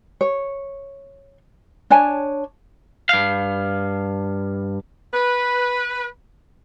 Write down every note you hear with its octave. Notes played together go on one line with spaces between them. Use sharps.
C#5
D4 C#5 G#5 A5
G2 F5
B4